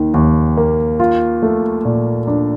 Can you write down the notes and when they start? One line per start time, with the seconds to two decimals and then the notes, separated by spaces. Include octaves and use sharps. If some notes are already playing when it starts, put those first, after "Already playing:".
Already playing: D#2 D#3
0.14 D#2
0.57 A#3
1.00 F4
1.43 A3
1.85 A#2
2.27 D4